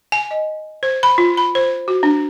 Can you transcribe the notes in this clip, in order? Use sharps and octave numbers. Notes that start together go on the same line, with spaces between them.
G#5
D#5
C5
B5
F4
B5
C5
F#4
D4